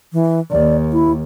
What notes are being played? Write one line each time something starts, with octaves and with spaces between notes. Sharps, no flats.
E3
D#2 D5
E4